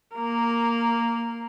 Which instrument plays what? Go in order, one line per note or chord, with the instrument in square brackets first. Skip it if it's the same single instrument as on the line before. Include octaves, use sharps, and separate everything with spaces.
[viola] A#3 A#4